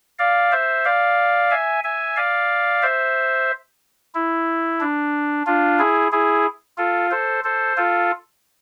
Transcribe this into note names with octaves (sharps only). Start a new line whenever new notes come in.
D5 F5
C5 E5
D5 F5
E5 G#5
E5 G#5
D5 F5
C5 E5
E4
D4
D4 F4
E4 G#4
E4 G#4
F4 A4
A4 C5
A4 C5
F4 A4